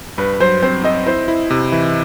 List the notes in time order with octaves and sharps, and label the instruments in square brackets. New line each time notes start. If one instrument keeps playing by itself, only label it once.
[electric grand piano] G2 [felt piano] B4
[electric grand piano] F#3 [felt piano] C5
[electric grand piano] C4 [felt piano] C5
[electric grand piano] C4 [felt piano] D#5
[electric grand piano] E4 [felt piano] C5
[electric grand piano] E4
C3
E3